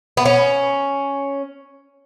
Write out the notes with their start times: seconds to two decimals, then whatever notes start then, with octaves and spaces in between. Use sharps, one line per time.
0.17 B3
0.26 C#4